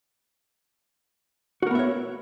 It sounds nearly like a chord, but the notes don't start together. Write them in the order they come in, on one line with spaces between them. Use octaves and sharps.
F#4 A#4 B3 E5 C#5